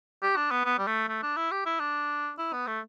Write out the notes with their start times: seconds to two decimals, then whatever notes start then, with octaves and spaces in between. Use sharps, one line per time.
0.22 G4
0.36 D4
0.51 B3
0.65 B3
0.79 G3
0.87 A3
1.09 A3
1.23 D4
1.37 E4
1.52 G4
1.66 E4
1.80 D4
2.38 E4
2.53 B3
2.67 A3